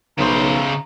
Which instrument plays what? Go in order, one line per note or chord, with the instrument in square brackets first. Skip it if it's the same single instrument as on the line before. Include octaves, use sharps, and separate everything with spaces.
[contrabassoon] B1 [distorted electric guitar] C#3 C5 [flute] A#5